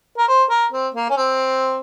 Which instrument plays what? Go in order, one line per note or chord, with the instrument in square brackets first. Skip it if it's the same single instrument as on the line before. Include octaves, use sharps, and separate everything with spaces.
[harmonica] A#4
C5
A#4
C4
A#3
C#4
C4